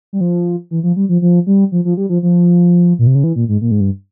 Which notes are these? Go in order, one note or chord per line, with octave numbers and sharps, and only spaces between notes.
G3
F3
E3
F3
G3
F3
F3
G3
F3
F3
G3
F3
F3
A#2
C3
C#3
E3
A#2
G#2
A#2
G#2
G2